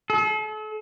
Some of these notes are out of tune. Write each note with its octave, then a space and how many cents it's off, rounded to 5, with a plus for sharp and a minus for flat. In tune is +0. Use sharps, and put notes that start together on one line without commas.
A4 -40